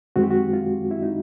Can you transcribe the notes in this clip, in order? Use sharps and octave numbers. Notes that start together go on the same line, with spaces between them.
F#2 D#3 G#3 C4 F#4
G4
F#4
F4
E4
D#4